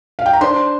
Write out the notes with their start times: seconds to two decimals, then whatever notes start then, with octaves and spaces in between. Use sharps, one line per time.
0.19 F5
0.26 G5
0.33 A#5
0.41 D4 C5 C6